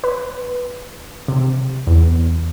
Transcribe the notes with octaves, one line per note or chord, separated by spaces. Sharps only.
B4
C3
E2